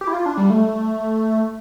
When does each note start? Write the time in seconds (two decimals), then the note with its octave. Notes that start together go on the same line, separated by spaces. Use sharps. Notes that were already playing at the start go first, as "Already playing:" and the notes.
0.01 G4
0.07 E4
0.13 F4
0.26 D4
0.37 G3
0.50 A3